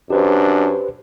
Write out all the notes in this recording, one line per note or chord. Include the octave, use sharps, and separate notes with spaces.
F#2 D4 G4 B4 C5